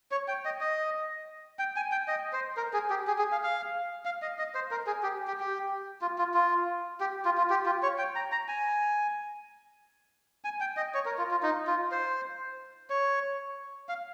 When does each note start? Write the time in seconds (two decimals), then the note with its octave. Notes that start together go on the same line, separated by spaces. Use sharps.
0.11 C#5
0.28 G5
0.45 D#5
0.61 D#5
1.59 G5
1.76 G#5
1.92 G5
2.08 D#5
2.33 C5
2.57 A#4
2.73 G#4
2.90 G4
3.07 G#4
3.18 G#4
3.32 F5
3.43 F5
4.05 F5
4.22 D#5
4.39 D#5
4.55 C5
4.71 A#4
4.87 G#4
5.03 G4
5.28 G4
5.40 G4
6.02 F4
6.18 F4
6.34 F4
7.00 G4
7.25 F4
7.37 F4
7.50 G4
7.66 F4
7.83 C#5
7.98 G5
8.16 A#5
8.32 A#5
8.48 G#5
10.44 G#5
10.60 G5
10.77 D#5
10.94 C#5
11.06 A#4
11.18 F4
11.31 F4
11.43 D#4
11.67 F4
11.92 C5
12.90 C#5
13.89 F5